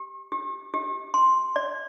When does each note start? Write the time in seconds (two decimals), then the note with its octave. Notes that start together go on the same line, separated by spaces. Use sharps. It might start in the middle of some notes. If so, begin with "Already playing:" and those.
Already playing: G4
0.32 G4
0.74 G4
1.14 C6
1.56 D5